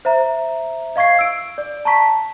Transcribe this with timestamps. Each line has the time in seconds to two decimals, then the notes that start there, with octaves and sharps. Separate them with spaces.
0.05 C5 E5 A#5
0.96 D#5 F5 C#6 G#6 C7
1.19 E6 D7
1.58 D5
1.85 A5 A#5 C#6 B6